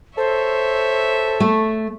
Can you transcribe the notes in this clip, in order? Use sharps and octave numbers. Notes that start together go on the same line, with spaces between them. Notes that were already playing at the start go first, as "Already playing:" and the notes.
A4 C5 C#5 E5
A3